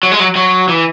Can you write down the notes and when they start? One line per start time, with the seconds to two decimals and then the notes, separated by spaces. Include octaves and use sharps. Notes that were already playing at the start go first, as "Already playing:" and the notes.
0.03 F#3
0.11 G#3
0.20 F#3
0.36 F#3
0.69 E3